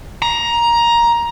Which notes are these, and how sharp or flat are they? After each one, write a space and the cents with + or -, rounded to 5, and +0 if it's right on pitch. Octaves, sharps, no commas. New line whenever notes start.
A#5 +15